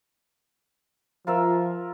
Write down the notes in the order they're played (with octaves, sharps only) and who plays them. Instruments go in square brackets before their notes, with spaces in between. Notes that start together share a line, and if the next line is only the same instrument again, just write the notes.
[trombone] F3 [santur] F4 A#4 E5